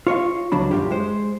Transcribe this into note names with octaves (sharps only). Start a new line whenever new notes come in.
F4 C#5 D#5 F5
C#2 F#3 D4 B5
F#2 E3 F4 G4
G#3 C5